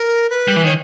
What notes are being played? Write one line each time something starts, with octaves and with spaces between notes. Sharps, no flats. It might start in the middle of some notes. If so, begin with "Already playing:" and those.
Already playing: A#4
B4
G3
E3
D#3 C#5